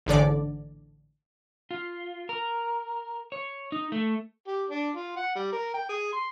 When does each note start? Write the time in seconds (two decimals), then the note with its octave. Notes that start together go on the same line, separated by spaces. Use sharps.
0.06 A1 G#2 D3 D5
1.71 F4
2.29 A#4
3.32 C#5
3.72 D#4
3.92 A3
4.47 G4
4.70 D4
4.96 F4
5.16 F#5
5.35 G3
5.52 A#4
5.74 G5
5.89 G#4
6.13 C6